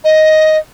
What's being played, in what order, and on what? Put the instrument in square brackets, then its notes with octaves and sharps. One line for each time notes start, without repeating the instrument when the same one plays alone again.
[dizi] D#5